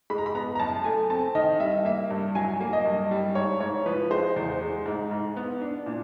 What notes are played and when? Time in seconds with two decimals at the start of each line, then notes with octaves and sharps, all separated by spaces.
0.10 G#3 B5
0.18 A#5
0.26 B5
0.35 B3 A#5
0.55 A#5
0.59 F#2 A5
0.84 A3 G#5
1.10 C4 A5
1.35 D#3 D#5
1.60 G3 E5
1.85 A#3 E5
2.11 G2
2.35 F#3 G#5
2.60 A#3
2.73 D#5
2.86 G2
3.11 G3
3.35 G#2 C#5
3.60 G#2 C#5
3.86 F3 B4
4.11 G#3 C5
4.36 E2 C5
4.61 G#3
4.86 G#2
5.11 G#2
5.37 B3
5.62 D4
5.86 A#2